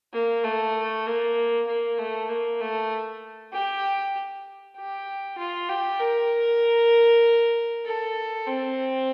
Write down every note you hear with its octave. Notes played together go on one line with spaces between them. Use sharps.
A#3
A3
A#3
A#3
A3
A#3
A3
G4
G4
F4
G4
A#4
A4
C4